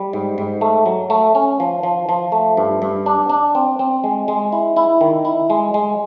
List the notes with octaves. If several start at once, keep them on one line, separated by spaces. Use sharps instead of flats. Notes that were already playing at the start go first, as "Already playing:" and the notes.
Already playing: G3
G#2
G#2
A3
F#3
A3
C#4
F3
F3
F3
A3
G2
G2
D4
D4
C4
C4
G#3
G#3
E4
E4
D#3
E4
G#3
G#3